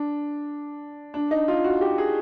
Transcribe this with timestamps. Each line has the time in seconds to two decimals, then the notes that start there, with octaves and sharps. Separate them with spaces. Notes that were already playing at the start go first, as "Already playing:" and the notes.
Already playing: D4
1.14 D4
1.31 D#4
1.48 F4
1.64 F#4
1.81 G4
1.98 G#4